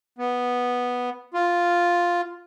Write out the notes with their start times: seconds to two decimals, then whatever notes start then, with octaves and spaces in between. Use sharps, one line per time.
0.18 B3
1.34 F4